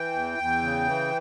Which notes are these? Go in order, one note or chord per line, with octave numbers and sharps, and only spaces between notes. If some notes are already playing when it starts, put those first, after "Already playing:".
Already playing: E3 G5
E2
E2
C#3
E3